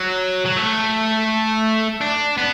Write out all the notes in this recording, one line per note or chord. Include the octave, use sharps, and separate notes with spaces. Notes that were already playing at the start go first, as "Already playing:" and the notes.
Already playing: F#3
F#3
A3
D4
B3